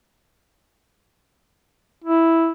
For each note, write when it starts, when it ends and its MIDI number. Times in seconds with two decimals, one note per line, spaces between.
2.04 2.52 64